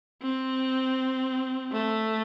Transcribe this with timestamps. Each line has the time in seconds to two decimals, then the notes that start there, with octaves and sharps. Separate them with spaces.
0.22 C4
1.72 A3